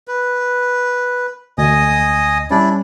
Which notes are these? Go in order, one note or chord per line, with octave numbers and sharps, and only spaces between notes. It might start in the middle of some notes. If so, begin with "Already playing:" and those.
B4
D2 D#5 G#5 D#6
G3 C#4 D4 E4 D5